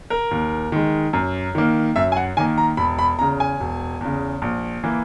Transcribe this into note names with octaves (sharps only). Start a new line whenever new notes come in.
A#4
D#2
D#3 G#3
F#2
D#3 A#3
F#2 E5
G#5
F#5
D#3 A#3 G#5
A#5
E1 B5
B5
E2 C#3 A#5
G#5
E1
E2 C#3
A#1
E3 A#3